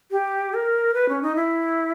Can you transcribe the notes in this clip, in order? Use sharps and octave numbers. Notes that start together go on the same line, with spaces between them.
G4
A#4
B4
C#4
D#4
E4